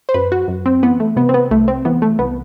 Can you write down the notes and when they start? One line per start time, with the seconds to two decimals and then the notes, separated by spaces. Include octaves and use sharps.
0.09 C5
0.14 F#2 B4
0.32 F#4
0.48 F#2
0.66 C4
0.83 E3 B3
1.00 A3
1.16 C3 B3
1.29 C4
1.34 B3
1.51 C2 A3
1.68 C4
1.85 E3 B3
2.02 A3
2.19 C2 B3